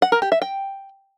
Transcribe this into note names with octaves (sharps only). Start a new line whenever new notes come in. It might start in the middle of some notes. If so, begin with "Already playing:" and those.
F#5
A#4
G4
E5
G5